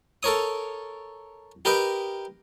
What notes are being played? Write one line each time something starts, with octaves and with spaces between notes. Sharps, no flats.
A4 A#4 C#5 D#6
G4 A#4 B4 D#5 G5